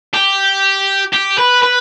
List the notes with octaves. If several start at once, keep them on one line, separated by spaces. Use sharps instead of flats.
G4
G4
B4
B4